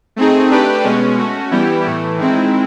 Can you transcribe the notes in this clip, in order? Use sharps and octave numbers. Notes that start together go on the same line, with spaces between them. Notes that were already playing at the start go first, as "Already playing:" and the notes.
A3 C4 D#4 G#4
A3 D4 G4 B4 D5
B2 G#3 C#4
A3 C#4 F#4
E3 G3 B3 E4 G4
A2 E3 A3
D#3 G#3 C4 E4